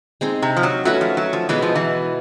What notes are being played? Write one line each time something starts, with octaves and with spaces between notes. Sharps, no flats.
G#3 C4 D#4 G#4
C3
F3
F#3
F#3 A3 C#4 F#4 B4
F3
F#3
F3
B2 E3 G#3 B3 E4
F3
E3